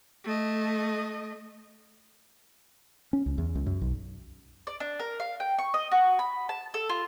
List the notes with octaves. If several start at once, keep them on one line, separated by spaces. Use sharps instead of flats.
A3 D#5
C#4
C#2
E2
C#2
F#2
B1
D5
D4
A#4
F5
G5
C#6
D#5
F#4
B5
A5
A4
F4